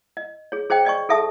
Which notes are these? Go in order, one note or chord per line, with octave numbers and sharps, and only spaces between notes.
D#5
G#4 C#5
G#4 C5 D#5 G5
D5 D#5 G#5 C#6
G#4 A4 E5 A5 D#6